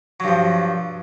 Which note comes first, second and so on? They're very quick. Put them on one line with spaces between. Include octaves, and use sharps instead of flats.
F#3 G2 F3